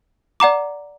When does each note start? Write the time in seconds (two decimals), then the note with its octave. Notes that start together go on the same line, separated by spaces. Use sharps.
0.40 D5 F#5 A#5 D6